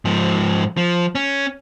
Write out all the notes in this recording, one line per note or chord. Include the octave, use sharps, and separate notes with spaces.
G#2 F3
F3
C#4